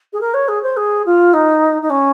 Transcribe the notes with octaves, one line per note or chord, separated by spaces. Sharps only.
G#4
A#4
C#5
G#4
C5
G#4
F4
D#4
D#4
C#4